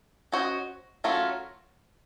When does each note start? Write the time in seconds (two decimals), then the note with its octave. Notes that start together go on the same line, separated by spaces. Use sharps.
0.32 C#4 F#4 C5 D#5
1.04 F#3 A3 C#4 F4 A#4